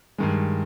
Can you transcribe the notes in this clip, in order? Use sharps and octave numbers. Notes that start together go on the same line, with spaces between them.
G2 D#3 G#3